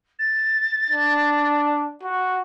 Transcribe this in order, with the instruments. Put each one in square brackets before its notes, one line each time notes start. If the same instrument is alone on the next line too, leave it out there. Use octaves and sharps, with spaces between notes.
[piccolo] A6
[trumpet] D4
F#4